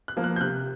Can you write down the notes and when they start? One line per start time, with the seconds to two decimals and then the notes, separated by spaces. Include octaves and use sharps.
0.08 F#6
0.16 F3 A#3
0.24 F#6
0.36 G6
0.41 C3 F#6